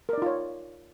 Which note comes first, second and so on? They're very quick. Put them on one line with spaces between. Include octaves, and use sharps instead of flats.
A#4 D5 D#4 F4 C#5